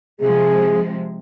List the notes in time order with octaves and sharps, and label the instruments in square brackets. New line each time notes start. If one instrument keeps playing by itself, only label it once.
[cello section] C3 F3 G#3 [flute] G#4